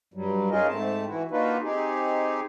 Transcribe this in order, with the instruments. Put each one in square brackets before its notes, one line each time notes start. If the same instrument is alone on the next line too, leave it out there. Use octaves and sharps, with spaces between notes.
[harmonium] G2 F#3 G3
C#4 D#4 F4 G#4 A#4 D#5
G#2 A3 C4 A5
E3 E4 F#4
A#3 D4 D#4 F4 F#4 B4
C4 D#4 G4 G#4